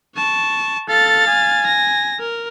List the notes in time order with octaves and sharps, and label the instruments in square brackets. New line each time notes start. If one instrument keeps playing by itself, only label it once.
[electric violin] A5 C#6
[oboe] A4 [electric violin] F5 A6
[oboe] G#5
[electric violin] A#6
A#4